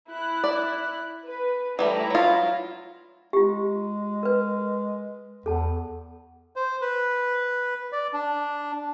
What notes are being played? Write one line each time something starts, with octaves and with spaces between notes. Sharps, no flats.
E4 F#6
D5
B4
E3 G3 A3 E4 A#5
F#3 F4
G#3 F4 G4
A#4 B4
E2 A4 A5
C5
B4
D5
D4